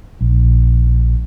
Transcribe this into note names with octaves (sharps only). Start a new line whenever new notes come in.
A#1